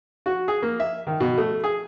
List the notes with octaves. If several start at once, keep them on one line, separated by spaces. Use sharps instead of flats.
F#4
G#4
A#3
E5
D#3
B2
A3
G#4